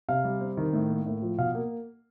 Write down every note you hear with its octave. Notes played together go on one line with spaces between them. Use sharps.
C3 F5
G3
C4
D#3
A2
A#3
A2
F3
B2 F5
A#3